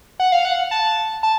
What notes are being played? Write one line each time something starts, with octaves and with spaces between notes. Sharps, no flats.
F#5
F5
F#5
A5
A5